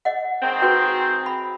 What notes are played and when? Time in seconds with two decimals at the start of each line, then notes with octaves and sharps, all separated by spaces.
0.05 D#5 F#5
0.41 D#3 G#3 C4
0.62 F#4 B4 G5
1.26 B5